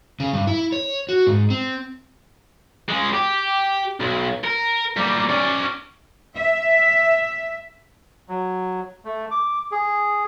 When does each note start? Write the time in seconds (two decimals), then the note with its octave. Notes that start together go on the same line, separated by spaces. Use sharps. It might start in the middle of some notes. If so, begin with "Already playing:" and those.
0.20 C#3
0.33 G2
0.47 E4
0.72 C#5
1.09 F#4
1.27 G#2
1.50 C4
2.89 G#3 C#4
3.14 G4
4.00 B1
4.44 A#4
4.97 G3 A#3
5.29 C#4 D5
6.36 E5
8.29 F#3
9.05 A3
9.31 D6
9.72 G#4